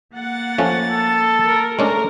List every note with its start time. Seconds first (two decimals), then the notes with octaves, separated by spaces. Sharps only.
0.15 A#3 F#5 A6
0.58 F3 A3 C#4
0.89 A4
1.46 A#4
1.79 G#3 A3 C#4 D4 A#4